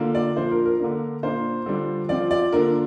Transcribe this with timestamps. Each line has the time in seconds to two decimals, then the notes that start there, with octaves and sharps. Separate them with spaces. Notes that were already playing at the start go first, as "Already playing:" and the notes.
Already playing: D3 A#3 F4
0.15 D5
0.36 A#2 F3 D4 F4 C5
0.51 A#4
0.66 A#4
0.80 D3 A#3 D4
1.23 A#2 A#3 D4 F4 C5
1.66 D3 G3 D4 F4
2.09 F3 C4 F4 D5
2.31 D5
2.52 D3 A#3 D4 F4 A#4